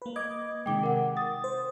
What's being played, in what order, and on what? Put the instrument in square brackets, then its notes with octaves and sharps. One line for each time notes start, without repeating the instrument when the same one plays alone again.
[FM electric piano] A#3 B4
[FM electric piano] D#5 D6 [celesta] G#6
[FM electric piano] C3 D#3 G#3 [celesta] G5 D6
[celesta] A#4 F#5
[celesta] D#6 [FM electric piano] A6
[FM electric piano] C5